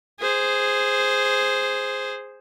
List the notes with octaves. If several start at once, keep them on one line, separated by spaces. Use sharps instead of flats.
G#4 C5